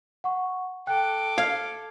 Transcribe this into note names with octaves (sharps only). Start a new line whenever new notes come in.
F#5 C#6
A4 G5 D6 F#6
F5 G#6